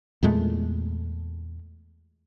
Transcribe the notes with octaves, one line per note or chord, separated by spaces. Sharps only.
E2 A#2 G#3 A3